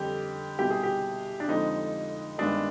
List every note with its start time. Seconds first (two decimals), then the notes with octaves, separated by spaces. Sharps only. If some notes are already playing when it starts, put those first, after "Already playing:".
Already playing: F2 D3 G3 G4
0.59 C2 B2 G3 G4
0.70 G#4
0.83 G4
1.40 D4
1.49 F2 D3 F3 G#3 D#4
2.38 G1 G2 D#3 G#3 D4